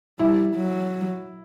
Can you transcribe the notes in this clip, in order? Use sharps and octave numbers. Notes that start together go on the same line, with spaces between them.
G3 E4
F#3